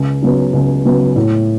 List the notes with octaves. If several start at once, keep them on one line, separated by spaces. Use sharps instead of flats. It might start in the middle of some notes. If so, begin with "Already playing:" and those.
Already playing: C#2
C#3 F#3 B3
C#2
C#3 F#3 B3
A2